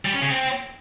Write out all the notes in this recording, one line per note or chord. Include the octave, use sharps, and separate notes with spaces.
G3
C#4
C#3
C4